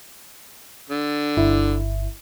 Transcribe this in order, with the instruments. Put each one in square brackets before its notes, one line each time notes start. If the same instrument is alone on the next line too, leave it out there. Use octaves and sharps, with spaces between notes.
[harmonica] D3
[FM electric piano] G1 E4